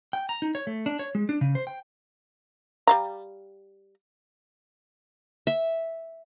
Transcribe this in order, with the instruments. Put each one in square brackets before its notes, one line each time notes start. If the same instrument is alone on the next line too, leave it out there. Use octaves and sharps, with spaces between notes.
[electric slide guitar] G5
A#5
D#4
C#5
A3
D4
C#5
G#3
D4
C#3
C5
G5
[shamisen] G3 F5 A#5
[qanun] E5